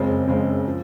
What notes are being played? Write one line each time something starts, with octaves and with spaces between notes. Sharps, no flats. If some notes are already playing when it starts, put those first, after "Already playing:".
Already playing: F#1 F2 C#3 G#3 C4
F#1 F2 C#3 G#3 C4
F3